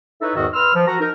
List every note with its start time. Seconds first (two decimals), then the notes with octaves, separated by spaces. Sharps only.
0.22 D#4 E4 A4 B4 C#5 E5
0.35 E2 G#2 D#3 F#4 D#5 E6
0.54 B4 C6 E6 F6
0.74 F3
0.86 F#4 A#4 A#5
1.00 D#4 A#4